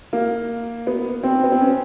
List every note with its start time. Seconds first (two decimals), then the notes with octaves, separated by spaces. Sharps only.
0.13 A#3
0.87 B3
1.23 C4
1.44 B3
1.52 C4
1.61 C#4